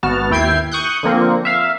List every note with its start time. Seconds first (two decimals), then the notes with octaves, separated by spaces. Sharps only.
0.03 G#1 B3 F#4 A5 F6
0.30 D#2 E4 G5 G#6 C7
0.71 C#6 D#6 F#6 G6
1.03 D3 F3 A#3 C4
1.45 E5 F5